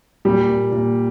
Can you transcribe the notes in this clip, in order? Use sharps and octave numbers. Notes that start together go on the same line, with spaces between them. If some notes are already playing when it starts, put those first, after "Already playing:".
A#2 G3
A#2
A#2